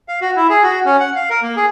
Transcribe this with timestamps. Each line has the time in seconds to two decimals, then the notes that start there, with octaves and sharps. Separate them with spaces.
0.08 F5
0.21 F#4
0.36 E4
0.50 G#4
0.63 F#4
0.85 C#4
1.00 F#5
1.15 F5
1.30 A#4
1.42 A#3
1.56 G#4